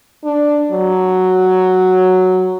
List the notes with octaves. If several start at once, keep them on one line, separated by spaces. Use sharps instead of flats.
D4
F#3